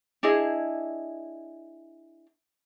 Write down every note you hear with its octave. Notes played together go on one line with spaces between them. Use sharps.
D4 E4 G#4 D#5